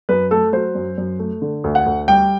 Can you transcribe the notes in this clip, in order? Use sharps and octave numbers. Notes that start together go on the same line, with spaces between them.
F#2 B4
A3 A4
F#3 C5
F#2
F#2
A3
D3
D2
F#5
D2
G3 G5